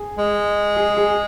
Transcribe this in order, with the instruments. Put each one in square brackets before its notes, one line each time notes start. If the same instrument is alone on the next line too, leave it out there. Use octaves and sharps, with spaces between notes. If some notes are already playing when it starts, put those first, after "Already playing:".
Already playing: [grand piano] G#4
[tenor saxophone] G#3
[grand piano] G#4
G#4